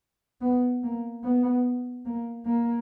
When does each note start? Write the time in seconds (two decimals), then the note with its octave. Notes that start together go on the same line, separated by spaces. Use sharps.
0.41 B3
0.83 A#3
1.23 B3
2.06 A#3
2.46 A#3